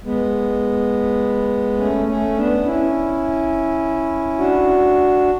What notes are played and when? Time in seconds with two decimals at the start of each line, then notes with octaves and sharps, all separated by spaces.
0.05 G#3 B3
1.78 A3 C#4
2.07 A3 C#4
2.37 B3 D4
2.66 C#4 E4
4.39 D4 F#4